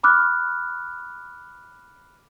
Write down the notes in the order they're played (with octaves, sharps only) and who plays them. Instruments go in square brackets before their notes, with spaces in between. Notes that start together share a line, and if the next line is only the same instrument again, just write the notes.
[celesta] B5 D6 F6 F#6